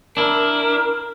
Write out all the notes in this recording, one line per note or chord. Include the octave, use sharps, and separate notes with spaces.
D4 E4 A#4